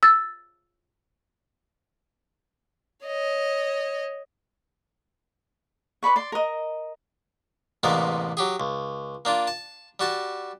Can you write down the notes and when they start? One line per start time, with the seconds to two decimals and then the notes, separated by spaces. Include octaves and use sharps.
0.03 E6 A6
3.05 C#5 D#5
6.03 B4 D5 B5 C#6
6.16 D5 C6
6.32 A#4 D#5
7.83 A1 C3 G#3 A#3 B3 D5
8.37 F#3 G4 G#4
8.60 C#2
9.25 A#3 D4 F4
9.47 A5
10.00 G3 F#4 A5